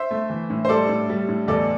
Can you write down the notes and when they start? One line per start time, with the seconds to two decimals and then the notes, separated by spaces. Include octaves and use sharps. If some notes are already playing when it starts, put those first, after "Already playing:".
Already playing: C5 E5
0.11 A3
0.30 E3
0.50 A2
0.65 C5
0.69 G3 A4 D5
0.89 A2
1.09 G3
1.28 A2
1.48 E2 A4 D5